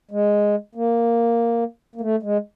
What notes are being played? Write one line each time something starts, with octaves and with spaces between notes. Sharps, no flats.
G#3
A#3
A#3
A3
G#3